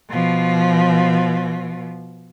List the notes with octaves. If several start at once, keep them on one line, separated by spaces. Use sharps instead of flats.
B2 F3